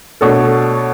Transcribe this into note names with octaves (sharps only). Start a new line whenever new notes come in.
B2 A3 D4 A4 C#5